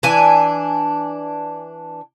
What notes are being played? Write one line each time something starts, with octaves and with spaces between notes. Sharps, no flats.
E3 D4 G#5